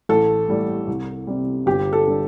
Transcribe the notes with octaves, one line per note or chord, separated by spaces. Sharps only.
A1 A4
A2 G3
C2
C3 G3
G1 G4
A4
D3 G3